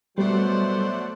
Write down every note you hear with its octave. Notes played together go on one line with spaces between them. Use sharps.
B2 F#3 G3 A3 C5 D5 F#5